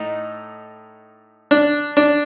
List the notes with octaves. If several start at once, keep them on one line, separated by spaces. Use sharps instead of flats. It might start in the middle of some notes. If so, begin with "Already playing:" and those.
Already playing: A2 A3 D#4
D4
D4